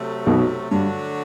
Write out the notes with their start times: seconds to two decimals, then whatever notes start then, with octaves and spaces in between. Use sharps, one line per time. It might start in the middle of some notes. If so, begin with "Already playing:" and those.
Already playing: C3 F#3 A3
0.27 B1 B2
0.71 G2 D3 F#3 A3 D4 F#4